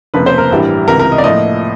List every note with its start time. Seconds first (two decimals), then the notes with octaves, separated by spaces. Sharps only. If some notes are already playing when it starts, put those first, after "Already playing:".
0.14 F1 F2 C#3 F3 A#3 B4
0.26 C5
0.38 A#4
0.51 A1 G2 E3 G3
0.87 C#2 C3 E3 A#4
1.00 A#4
1.12 D#5
1.18 D5
1.24 A2 F3 A#3 D#5